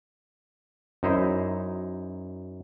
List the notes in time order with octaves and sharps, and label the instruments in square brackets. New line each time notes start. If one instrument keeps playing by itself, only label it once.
[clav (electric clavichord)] F#2 D#4 E4 C5